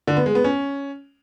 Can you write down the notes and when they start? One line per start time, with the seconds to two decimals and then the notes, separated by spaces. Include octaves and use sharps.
0.07 D3
0.17 B3
0.26 G#3
0.35 B3
0.44 C#4